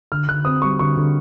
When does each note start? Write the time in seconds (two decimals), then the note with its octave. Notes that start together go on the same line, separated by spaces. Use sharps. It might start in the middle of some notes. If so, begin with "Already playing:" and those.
0.12 D3 F6
0.28 D3 F#6
0.45 C4 D#6
0.62 G3 C#6
0.79 D3 C#6
0.97 D3